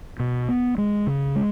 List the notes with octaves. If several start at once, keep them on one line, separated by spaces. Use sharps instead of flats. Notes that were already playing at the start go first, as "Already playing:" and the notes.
B2
B3
G#3
C#3
G#3